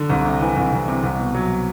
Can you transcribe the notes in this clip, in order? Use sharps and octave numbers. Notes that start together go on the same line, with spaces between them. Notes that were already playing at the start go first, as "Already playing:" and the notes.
Already playing: D3
C2
C3
E3
C2
C2
C3
C2
B2
F#3